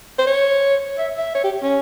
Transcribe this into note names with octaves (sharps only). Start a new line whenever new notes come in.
C5
C#5
E5
E5
C#5
G4
C#4